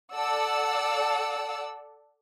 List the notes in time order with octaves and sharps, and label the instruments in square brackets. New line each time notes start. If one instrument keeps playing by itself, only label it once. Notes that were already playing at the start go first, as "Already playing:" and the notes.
[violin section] A4 D5 F#5 A5 E6